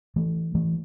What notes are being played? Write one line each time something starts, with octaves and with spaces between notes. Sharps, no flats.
E3 A3
E3 A3